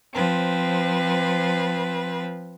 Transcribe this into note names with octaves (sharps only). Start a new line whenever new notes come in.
F3 C4 B4